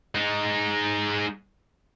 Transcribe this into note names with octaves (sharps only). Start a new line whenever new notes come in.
G#3 D#4